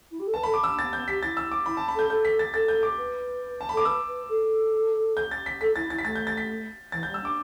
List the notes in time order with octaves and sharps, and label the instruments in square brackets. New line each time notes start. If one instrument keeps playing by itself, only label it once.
[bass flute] E4
G4
A4
[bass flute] B4 [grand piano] A5
[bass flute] A4 [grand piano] B5
[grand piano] D6
[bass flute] D4 [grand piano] E6
[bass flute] B3 [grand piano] A6
[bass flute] B3 [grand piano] G6
[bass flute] G4 [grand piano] B6
[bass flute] E4 [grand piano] A6
[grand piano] E6
D6
[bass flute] E4 [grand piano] B5
[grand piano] A5
B5
[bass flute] A4 [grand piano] G6
[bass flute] A4 [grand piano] G6
[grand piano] B6
A6
[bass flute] A4 [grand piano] A6
[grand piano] G6
D6
[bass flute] B4
[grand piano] A5
B5
[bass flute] A4 [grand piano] D6
[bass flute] B4 [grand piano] E6
[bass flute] B4
A4
[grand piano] G6
A6
B6
[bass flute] A4 [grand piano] B6
[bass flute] E4 [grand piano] A6
[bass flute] E4 [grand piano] A6
[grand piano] B6
[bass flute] A3 [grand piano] A6
[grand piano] G6
A6
B6
[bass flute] E3 [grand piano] A6
[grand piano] G6
[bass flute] G3
[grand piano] E6
[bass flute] D4 [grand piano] D6